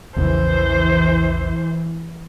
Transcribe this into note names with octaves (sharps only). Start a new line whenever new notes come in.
A#1 E2 C#3 E3 C5